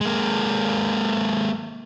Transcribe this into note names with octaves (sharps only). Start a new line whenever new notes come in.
G#3 A#3